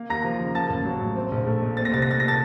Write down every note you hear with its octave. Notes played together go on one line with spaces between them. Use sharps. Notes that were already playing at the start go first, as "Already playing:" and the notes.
Already playing: A#3
D#2 A#5 A#6
F3
C#3
A#3 A5 A6
A1
F#3
A2
C4
A#1
A3
A#2
C4 A6
A#6
C2 A6
A#6
A3 A6
A#2 A#6
A5 A6